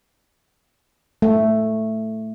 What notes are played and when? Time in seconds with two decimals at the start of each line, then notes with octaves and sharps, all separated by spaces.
1.22 A3